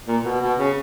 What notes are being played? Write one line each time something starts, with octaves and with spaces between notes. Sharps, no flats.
A#2
B2
B2
C#3